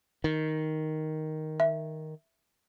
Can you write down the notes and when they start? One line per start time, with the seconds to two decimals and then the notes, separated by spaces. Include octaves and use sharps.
0.24 D#3
1.60 E5